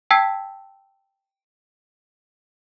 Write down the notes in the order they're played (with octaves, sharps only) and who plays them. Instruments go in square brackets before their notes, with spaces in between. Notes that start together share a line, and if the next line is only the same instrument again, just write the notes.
[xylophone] G5 A5 E6 G#6 B6 C7